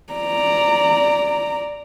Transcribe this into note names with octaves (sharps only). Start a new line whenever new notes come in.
D5 A#5